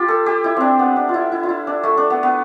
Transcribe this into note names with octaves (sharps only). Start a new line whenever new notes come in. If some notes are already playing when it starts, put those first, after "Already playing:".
Already playing: F4 G4
A4
G4
E4
C4 D4
B3
D4
F4
E4
E4
F4
E4
D4
A3
D4
B3
B3